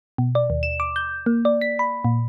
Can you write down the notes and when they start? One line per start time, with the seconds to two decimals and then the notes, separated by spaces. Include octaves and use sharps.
0.18 B2
0.35 D5
0.50 D#2
0.63 E7
0.80 D6
0.96 G6
1.26 A#3
1.45 D5
1.61 B6
1.79 B5
2.05 A#2